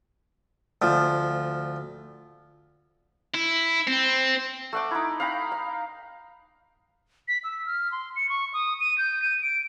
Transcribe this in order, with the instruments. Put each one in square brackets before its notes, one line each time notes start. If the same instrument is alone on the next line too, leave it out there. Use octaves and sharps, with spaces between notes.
[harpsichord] D2 F3
[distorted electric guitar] E4
C4
[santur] A3 F#5 D6
D#4 E4
F5 G5 A#5 B5
F5
[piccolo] B6
E6
F6
C6
C#7
C#6
D#6
D#7
G6
D#7
D7